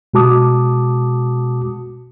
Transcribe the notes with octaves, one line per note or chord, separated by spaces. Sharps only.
B2 G#3 F#4 A5 D6 D#6